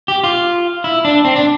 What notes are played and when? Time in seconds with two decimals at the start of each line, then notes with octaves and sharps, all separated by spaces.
0.08 G4
0.24 F4
0.84 E4
1.05 D4
1.25 C4
1.36 D4